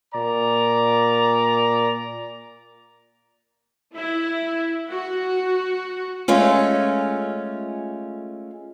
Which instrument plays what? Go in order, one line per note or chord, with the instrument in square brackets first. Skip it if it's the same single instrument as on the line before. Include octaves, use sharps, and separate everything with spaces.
[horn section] A#2 D5 A#5
[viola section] E4
F#4
[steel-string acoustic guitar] G#3 A3 C#4 F4